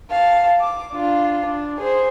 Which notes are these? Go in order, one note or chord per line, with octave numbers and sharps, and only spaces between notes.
F5 A5
D6
D4 F4
D4
G#4 C5